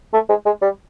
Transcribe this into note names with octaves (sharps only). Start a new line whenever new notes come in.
A3
G#3
G#3
G3